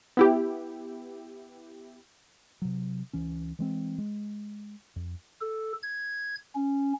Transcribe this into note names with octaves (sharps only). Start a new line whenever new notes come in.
B3 E4 G4
C3 F#3
C#2 E3 C#4
E3 G#3 C4
G#3
F2
A4
G#6
C#4